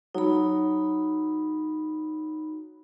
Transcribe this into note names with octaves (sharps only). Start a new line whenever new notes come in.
F#3 D#4 B5